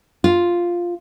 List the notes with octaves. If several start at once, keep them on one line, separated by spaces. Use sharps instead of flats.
F4